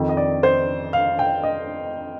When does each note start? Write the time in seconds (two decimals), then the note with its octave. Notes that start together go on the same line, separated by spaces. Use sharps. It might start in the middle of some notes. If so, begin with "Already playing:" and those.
Already playing: F2 D#3
0.09 D#5
0.17 D5
0.43 C5
0.93 F5
1.19 G5
1.43 D#5